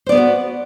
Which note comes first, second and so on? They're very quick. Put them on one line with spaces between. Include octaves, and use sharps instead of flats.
C5 D5 B3 G#4 F#4